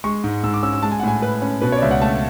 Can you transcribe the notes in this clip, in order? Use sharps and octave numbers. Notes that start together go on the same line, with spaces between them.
G#3 C#6
G#2
G#2 E6
D6
C#4 E6
E6
G#3 A5
G#5
F#5
A2 G#5
A2 B4
C#4
B2 B4
C#5 D5
C#2 E5
F#5
A3 A5